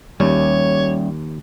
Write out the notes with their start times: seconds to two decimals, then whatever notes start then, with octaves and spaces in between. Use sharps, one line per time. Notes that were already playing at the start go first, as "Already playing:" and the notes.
0.20 D#2 G3 C#4 C#5